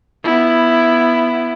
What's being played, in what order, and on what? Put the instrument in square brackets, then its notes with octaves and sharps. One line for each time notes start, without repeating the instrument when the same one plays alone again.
[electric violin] B3 E4